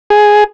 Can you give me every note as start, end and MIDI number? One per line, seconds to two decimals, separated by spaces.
0.10 0.44 68